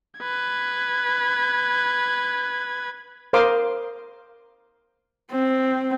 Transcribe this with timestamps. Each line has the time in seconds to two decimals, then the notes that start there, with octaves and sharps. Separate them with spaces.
0.19 B4 G#6
3.33 A#4 C5 F5 C6 D6 D#6
5.31 C4